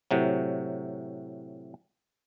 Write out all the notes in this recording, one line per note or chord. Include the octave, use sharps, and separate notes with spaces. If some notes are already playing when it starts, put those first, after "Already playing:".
A2 C3 F#3